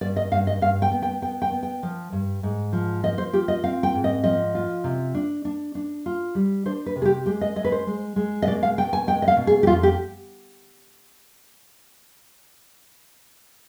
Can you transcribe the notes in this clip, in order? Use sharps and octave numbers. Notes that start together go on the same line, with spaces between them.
G2 D5
D#5
G2 F5
D#5
G2 F5
G5
B3
G5
B3 G5
G5
B3
G5
F3
G2
G#2
F3
F3 D#5
C5
F4 G4
D#5
C4 F5
G5
G#2
D#5
F3 D#5
F4
C3
D4
D4
D4
F4
G3
D4 C5
B4
C3
G#4
G4
G#3 G4
D#5
G#3 D#5
B4
C5
G#3
G#3
D#5
B2 D5
F5
B2 G5
G#5
G#3 G5
D#5
F5
B2
G#4
G4
F2 F4
G4